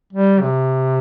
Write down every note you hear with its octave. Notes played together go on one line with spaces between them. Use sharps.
G3
C3